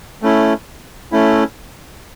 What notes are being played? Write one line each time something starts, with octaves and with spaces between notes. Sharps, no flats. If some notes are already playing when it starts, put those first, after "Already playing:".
A3 C#4 E4
A3 C#4 E4